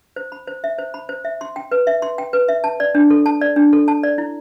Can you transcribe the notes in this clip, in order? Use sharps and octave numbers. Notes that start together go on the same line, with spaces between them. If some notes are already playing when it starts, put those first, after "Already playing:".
C5
B5
C5
E5
C5
B5
C5
E5
C6
G5
B4
E5
C6
G5
B4
E5
A5
D5
D4
A4
A5
D5
D4
A4
A5
D5
E4